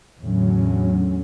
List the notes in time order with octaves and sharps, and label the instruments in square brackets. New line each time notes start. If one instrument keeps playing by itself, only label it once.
[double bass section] E2 A2 D3 F#3 C#4